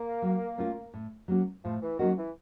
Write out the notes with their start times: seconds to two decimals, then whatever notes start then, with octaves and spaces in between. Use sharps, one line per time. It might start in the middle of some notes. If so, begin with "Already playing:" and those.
Already playing: A#3
0.22 F#3
0.58 A3 C#4 F4
0.94 A2
1.28 F#3 A#3 C#4 F#4
1.64 A2 F3
1.82 E3
1.99 D#3 F#3 A#3 C#4 F#4
2.17 E3